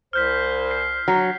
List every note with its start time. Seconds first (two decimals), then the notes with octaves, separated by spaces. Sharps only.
0.13 C2 C5 F6 G6 B6
0.71 C7
1.08 F#3